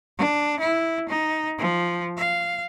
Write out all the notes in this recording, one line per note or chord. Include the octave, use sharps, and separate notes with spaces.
D4
E4
D#4
F3
F5